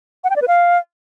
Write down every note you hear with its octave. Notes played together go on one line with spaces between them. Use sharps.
F#5
G5
D5
B4
F5